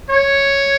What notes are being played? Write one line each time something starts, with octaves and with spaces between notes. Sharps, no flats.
C#5